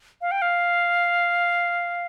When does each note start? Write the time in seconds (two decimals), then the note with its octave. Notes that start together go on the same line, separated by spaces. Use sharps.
0.21 F5
0.31 G5
0.42 F5